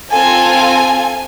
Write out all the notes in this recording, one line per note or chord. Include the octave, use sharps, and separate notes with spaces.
C4 F4 A4 G#5